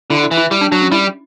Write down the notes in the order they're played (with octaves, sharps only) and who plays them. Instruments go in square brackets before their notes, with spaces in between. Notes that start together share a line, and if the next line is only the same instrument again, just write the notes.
[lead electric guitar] D3 [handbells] E4
[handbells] E4
[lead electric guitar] E3
[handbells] E4
[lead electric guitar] G3 [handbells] E4
[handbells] D4
[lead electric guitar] F#3 [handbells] D4
[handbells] C#4
[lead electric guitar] G3 [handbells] E4